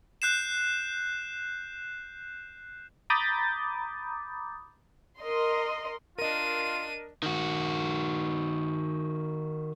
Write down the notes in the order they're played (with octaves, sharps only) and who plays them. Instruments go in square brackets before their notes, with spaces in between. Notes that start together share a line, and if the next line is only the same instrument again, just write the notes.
[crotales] F#6 G6 C7 E7
[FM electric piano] A#5 B5 D6 D#6 G6 A6
[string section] A#4 D#5 C6
[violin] D4 D#7 [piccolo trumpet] F4 [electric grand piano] A#4 D#5
[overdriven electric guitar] D#3 F#4